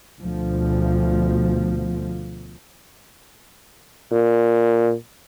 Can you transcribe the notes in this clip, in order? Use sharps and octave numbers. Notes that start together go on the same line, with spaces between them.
D2 B2 F3
A#2